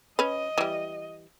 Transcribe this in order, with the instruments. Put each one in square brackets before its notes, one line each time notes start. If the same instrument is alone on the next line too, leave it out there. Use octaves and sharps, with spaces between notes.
[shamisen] C#4 B4 [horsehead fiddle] D#5
[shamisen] E3 G3